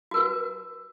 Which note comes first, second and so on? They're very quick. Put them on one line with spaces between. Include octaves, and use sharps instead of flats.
F#4 A#4 B4